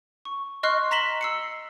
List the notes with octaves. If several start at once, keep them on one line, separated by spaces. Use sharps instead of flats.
C#6
D#5 C6 C#6 F6 F#6 C7
A#5 A#6 B6 E7 F#7 G7
E6 C7 C#7